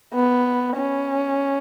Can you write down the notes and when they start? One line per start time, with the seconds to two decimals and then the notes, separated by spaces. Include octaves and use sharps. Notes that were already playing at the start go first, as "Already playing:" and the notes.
0.14 B3
0.76 C#4